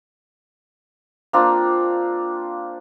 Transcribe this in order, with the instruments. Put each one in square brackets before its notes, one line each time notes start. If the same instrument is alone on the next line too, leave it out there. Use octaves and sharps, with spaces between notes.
[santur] A#3 C4 D4 F4